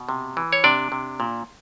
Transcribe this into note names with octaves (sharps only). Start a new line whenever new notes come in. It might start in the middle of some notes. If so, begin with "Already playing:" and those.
Already playing: B2
C3
E3
C#5
C3 D4 D5
C3
A#2